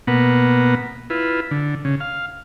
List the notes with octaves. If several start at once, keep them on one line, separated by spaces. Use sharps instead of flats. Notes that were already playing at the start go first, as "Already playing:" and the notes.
B2 A#3 B3 F#5
E4 F4 B4
D3
C#3
F5